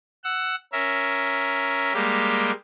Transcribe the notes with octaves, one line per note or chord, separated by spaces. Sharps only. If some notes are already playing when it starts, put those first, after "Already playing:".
F#5 E6
C#4 A#4 E5
G3 G#3 A#3 G4